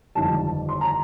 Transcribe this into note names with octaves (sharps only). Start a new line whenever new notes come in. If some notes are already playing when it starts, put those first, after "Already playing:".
G1 F2 D#3 G3 A5
C6
A#5